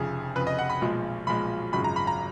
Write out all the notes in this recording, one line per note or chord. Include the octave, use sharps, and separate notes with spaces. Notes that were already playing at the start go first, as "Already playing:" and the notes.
Already playing: F1 F2 C#3 G#4
F1 F2 C#3 B4
D#5
F#5
B5
B1 A#2 F3 G#3
B1 A#2 F3 G#3 B5
G#1 F#2 C#3 F3 G#3 B5
A#5
B5
A#5